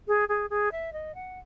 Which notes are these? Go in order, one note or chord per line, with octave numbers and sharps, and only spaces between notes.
G#4
G#4
G#4
E5
D#5
F#5